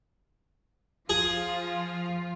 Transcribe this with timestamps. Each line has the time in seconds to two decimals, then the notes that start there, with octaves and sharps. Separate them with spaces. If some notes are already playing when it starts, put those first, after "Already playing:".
1.10 F3 F4 G#4